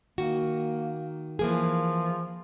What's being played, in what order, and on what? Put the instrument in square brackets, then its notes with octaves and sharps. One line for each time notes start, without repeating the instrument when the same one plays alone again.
[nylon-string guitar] D#3 F#4 [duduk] A#3
[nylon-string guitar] E3 A#3 G#4 [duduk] F3